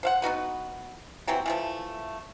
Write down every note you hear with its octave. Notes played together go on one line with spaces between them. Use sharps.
C5 F5 F#5
B3 D#4 F#4 B4
C3 E3 F#3 C4
E3 F3 A3